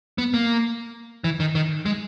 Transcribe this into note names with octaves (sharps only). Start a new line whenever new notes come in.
B3
A#3
E3
D#3
D#3
G#3